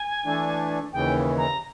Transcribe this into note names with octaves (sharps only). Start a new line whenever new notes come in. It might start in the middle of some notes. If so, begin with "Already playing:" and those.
Already playing: G#5
E3 A3 D4
D#2 C#3 E3 G5
A#5